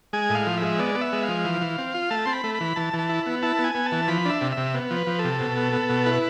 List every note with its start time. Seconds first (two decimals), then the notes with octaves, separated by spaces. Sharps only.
0.13 G#3 G#5
0.30 A2
0.35 F5
0.46 F3
0.57 G#3 E5
0.79 B3 D5
0.95 B3
1.01 E5
1.12 G#3
1.23 F5
1.28 F3
1.45 E3
1.61 E3
1.78 C4
1.94 F4
2.10 A3 A5
2.25 C4 C6
2.33 B5
2.44 A3
2.55 B5
2.61 E3
2.76 E3 A5
2.94 E3
2.99 A5
3.09 E4
3.26 B3
3.43 E4 A5
3.59 B3
3.64 G#5
3.75 B3
3.86 A5
3.92 E3
4.08 F3 B5
4.25 D4 E5
4.41 C3
4.52 E5
4.57 C3
4.75 B3
4.91 F3
4.97 B4
5.07 F3
5.19 A4
5.24 C3
5.40 B2
5.57 B3
5.73 B3
5.89 B2
6.06 E4 B4